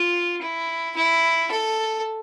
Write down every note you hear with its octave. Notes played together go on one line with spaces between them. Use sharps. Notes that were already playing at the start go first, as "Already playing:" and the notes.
Already playing: F4
E4
E4
A4